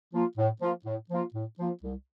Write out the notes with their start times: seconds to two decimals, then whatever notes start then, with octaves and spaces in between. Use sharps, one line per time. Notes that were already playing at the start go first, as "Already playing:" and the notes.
0.12 F3 A#3 F4
0.37 A2
0.61 F3 A#3 F4
0.85 A2
1.10 F3 A#3 F4
1.35 A2
1.59 F3 A#3 F4
1.83 C2